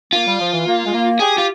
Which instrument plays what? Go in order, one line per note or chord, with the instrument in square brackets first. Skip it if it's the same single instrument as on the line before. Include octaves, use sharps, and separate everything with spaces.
[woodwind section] A#3 [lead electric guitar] F4
[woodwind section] G3
F3
E3
A#3
G#3
A#3
[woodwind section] G4 [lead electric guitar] G#4
[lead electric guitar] F4